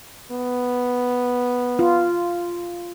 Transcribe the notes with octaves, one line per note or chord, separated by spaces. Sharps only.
B3
F4